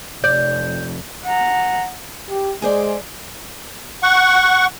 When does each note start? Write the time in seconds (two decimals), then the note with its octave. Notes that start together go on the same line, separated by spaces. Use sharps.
0.24 F1 F2 D5 G6
1.25 F#5 A#5
2.30 G4
2.62 G#3 G#4 C5 D5
4.03 F#5 C#6